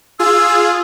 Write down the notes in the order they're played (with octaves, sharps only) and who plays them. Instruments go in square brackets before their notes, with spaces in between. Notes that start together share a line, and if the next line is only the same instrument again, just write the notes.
[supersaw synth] F4 G#4 [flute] E6